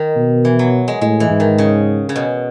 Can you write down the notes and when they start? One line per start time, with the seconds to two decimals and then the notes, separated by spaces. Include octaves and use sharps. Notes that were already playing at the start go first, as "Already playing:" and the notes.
Already playing: D#3
0.17 B2
0.45 E3
0.59 F#3
0.88 G#3
1.01 A2 G#3
1.20 E3
1.30 G#2
1.40 D#3
1.58 C#3
2.09 C#3
2.16 B2